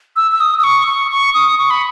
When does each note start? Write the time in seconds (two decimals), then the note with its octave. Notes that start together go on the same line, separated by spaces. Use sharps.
0.16 E6
0.32 E6
0.40 D#6
0.59 D#6
0.64 C#6
0.87 C#6
1.11 C#6
1.34 D#6
1.58 C#6
1.70 B5